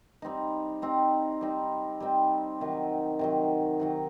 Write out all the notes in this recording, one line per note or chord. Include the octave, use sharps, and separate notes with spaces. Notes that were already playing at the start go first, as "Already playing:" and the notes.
G3 C4 D#4
G3 C4 D#4
G3 C4 D#4
G3 C4 D#4
C3 D#3 F#3
C3 D#3 F#3
C3 D#3 F#3